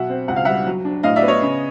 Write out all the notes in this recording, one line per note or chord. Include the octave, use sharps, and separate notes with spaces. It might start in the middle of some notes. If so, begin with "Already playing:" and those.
Already playing: B2 F#3 E5 F#5
C4
C#2 F#5
F5
G3 E5 F#5
F#3
D4
A2 D#5 F5
D5 E5
B3
C#5 D#5
C#3